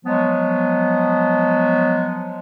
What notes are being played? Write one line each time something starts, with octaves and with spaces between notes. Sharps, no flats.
F3 F#3 G#3 B3